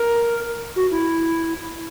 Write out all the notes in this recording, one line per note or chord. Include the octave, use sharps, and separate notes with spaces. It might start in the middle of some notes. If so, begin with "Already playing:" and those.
Already playing: A#4
F#4
E4